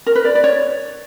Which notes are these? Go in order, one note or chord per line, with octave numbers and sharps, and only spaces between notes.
A#4
B4
D5
D5
C#5